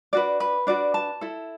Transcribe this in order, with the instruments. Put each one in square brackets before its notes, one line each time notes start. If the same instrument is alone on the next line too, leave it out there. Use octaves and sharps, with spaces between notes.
[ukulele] D4 F#4 B4 D5
B4
D4 F#4 B4 D5
A5
E4 A4